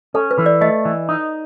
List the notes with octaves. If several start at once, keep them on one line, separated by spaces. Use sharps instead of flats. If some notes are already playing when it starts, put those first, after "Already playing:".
C#4 A4
B4
E3
D5
A3 D#5
E3
D#4